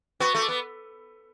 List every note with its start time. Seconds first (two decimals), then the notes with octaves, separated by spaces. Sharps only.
0.20 B3 F#4
0.35 A3
0.42 D5
0.49 B3